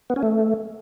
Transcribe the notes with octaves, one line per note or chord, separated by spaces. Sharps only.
B3
C#4
A3